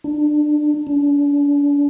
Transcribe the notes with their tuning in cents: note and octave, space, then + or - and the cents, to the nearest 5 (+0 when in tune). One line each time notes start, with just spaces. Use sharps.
D4 +25
D4 -40